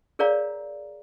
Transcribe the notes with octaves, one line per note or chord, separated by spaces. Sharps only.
G#4 A#4 C#5 D5 F5 A#5